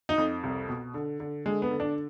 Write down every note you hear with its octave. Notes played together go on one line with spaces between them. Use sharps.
D#4
F2
C2
B2
D3
D3
D3 G#3
B3
D3
D4